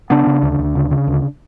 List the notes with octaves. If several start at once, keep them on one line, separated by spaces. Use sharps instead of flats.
C#3 B3 D4
C#3
D2
D2
C#3
C#3
D2